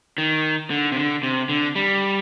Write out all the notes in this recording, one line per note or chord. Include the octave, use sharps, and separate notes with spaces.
D#3
D3
C3
D3
C3
D3
G3